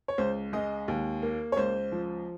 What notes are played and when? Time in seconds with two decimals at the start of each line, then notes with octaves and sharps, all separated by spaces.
0.08 C#5
0.18 C#2 C5
0.53 G#3 D#5
0.88 D#2
1.22 A#3
1.52 C#5
1.57 C#2 C5
1.92 F3